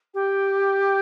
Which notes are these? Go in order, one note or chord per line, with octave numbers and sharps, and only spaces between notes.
G4